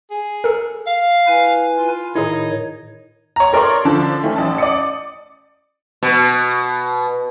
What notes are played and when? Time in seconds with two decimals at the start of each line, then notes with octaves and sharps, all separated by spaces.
0.11 G#4
0.44 A4 A#4
0.87 F5
1.27 E4 B4 G#5
1.76 F4
2.15 A2 D#3 D#4 E4 G#4 C#5
3.36 C#5 A#5
3.53 A4 A#4 C#5 D5 C6 C#6
3.85 D3 F3 D4 A5
4.23 D#3 A3 C#4
4.36 A1 C#4 A5
4.58 D5 D#6 C#7
6.03 B2